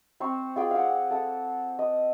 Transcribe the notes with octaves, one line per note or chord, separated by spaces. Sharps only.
C4 C5 C#6
F4 G#4 G5 D6
F5 F#5
A4 F#5
D#5